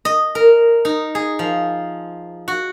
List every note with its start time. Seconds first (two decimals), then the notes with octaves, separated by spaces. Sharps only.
0.05 D#5
0.35 A#4
0.85 D#4
1.15 G#4
1.39 F3
2.48 F#4